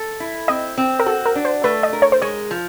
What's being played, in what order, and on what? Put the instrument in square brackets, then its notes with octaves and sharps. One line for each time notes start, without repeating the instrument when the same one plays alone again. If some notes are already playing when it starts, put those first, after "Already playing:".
Already playing: [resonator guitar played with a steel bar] A4
E4
[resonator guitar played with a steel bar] C4 [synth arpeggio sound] D#5
[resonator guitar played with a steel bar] C4
[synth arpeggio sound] A#4
[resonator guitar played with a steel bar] F#4 [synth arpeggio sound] A4
[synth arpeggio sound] A#4
[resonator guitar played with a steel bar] D4
[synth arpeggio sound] C5
[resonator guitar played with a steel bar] A3 [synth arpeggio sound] B4
[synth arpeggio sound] D#5
[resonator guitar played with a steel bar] A#4
[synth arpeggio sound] C#5
C5
[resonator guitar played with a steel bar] G#3 [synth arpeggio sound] C#5
[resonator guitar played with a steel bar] F3